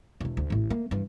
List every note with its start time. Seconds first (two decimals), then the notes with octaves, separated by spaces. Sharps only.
0.21 E1 A3
0.37 D2
0.50 A1 A2
0.70 A3 A#3
0.91 G2 E3